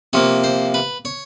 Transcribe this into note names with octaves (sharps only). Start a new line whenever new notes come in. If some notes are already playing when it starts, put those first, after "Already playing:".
C3 F3 A#3 C#5
C5
B4
C#5